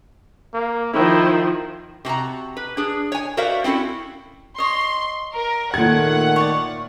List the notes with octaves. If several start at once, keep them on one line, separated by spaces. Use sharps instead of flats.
A#3
D#3 F3 E4
C3 F#4 A5 A#5
B4
D4 G#4
C#5 G#5
F#4 A#4 C5 D5 E5 F5
C4 C#4 E4 F#4 A4
C#5 D#5 C6
A#4
A#2 D#3 A3 F#5 G#6
C#5 D5